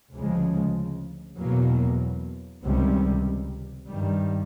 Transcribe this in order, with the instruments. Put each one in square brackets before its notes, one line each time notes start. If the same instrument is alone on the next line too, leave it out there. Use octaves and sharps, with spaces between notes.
[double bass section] D2 C#3 F3 G#3
E2 B2 F#3 A#3
C#2 C3 D#3 G3
G2 D#3 G3